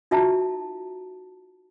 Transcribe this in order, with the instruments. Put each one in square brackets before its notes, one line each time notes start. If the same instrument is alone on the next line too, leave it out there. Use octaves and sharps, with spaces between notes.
[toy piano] D#4 F4 F#4 E5 A5 A#5